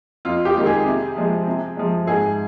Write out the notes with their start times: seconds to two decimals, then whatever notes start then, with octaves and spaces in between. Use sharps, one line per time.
0.25 F2 F4
0.45 G4
0.56 D#3 G#3
0.66 G#4
0.86 C3
1.16 F3 G#3
1.47 C3
1.77 F3 G#3
2.07 G#2 G#4